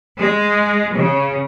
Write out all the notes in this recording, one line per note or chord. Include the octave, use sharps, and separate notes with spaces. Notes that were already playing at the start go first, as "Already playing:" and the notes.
G#3
C#3